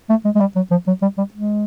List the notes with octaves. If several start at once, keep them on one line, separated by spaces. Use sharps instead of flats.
A3
G#3
G#3
G3
F#3
F3
F#3
G3
G3
G#3